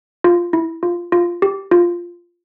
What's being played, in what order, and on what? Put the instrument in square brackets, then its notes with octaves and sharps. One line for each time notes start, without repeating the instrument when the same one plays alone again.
[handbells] F4
E4
F4
F4
G4
F4